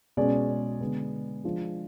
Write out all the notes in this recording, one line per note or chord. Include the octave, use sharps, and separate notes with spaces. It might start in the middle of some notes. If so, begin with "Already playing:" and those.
B2 G#3 C#4 G#4 D5
D3 G#3 B3
F3 G#3 D4